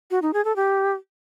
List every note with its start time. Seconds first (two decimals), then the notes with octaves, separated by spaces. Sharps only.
0.11 F#4
0.22 D#4
0.33 G#4
0.45 A4
0.56 G4